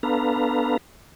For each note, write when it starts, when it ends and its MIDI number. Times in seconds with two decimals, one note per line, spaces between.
0.03 0.77 59
0.03 0.77 62
0.03 0.77 69
0.03 0.77 71
0.03 0.77 77
0.03 0.77 82